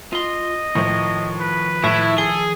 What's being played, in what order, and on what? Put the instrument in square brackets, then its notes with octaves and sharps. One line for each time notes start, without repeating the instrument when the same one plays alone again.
[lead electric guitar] F4 C6 [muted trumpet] D#5
[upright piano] A2 [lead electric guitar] D#3 F3
[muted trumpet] B4
[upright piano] A2 [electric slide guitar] E4
[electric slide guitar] G#4 [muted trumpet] A4 [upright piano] G7